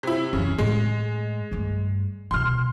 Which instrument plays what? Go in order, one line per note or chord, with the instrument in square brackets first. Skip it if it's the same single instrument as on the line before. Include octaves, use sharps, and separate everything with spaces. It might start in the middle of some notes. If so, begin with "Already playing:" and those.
[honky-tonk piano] C3 E4
[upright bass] F#2 E3 [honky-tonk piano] C#3
[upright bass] A2 [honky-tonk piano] G#3
[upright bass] G2 A3
[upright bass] D2 B2 [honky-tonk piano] C6 F6